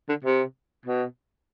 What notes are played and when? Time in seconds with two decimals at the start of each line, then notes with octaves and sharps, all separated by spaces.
0.09 D3
0.24 C3
0.85 B2